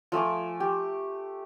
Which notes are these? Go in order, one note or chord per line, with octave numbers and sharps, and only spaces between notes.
F3 A3 G#5 D6
G4